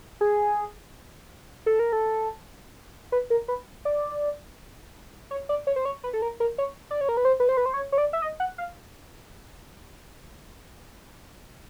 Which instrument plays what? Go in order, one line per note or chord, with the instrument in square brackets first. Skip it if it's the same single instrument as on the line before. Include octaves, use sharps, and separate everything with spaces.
[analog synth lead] G#4
A4
A#4
A4
B4
A#4
B4
D5
C#5
D5
C#5
C5
C#5
B4
A4
A#4
A#4
C#5
D5
C#5
A#4
B4
C5
B4
C5
B4
C5
C#5
C#5
D5
E5
D#5
F#5
F5